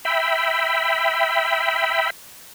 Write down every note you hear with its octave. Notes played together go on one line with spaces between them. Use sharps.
E5 G5 B5